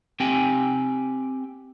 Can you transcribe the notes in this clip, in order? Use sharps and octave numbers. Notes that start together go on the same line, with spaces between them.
C4 G4 G5 G#5